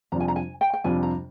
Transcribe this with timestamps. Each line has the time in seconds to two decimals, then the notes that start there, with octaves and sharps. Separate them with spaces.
0.12 F2 C3 G3 D4 F4 A#5
0.20 G#5
0.28 A#5
0.36 G#5
0.61 G5
0.73 G5
0.84 F2 C3 G3 D4 F4 G#5
1.03 A#5